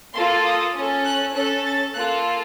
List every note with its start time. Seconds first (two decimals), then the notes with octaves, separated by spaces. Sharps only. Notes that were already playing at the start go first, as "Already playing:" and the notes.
0.14 A#3 F4 A4 C6
0.44 D#6
0.75 C#4 A4
1.05 F#6
1.33 C#4 A4 F#6
1.65 A6
1.93 A#3 F4 A4 F#6